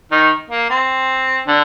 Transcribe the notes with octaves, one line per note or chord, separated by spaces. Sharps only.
D#3 D#4
A#3
C4
D3 D4